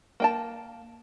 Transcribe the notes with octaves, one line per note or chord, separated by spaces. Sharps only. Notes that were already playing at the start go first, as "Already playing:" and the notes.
A#3 G5 A5